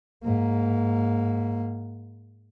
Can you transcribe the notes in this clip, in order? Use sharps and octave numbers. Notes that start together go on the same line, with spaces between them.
G#2 A#3